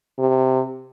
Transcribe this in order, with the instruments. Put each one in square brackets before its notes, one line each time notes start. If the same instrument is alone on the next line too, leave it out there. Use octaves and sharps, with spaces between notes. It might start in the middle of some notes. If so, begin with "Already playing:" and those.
[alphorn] C3